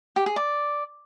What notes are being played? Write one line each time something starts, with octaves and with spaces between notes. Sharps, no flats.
G4
G#4
D5